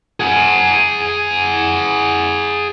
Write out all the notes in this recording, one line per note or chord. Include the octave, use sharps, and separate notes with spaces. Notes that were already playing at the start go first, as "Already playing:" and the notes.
G#4 F#5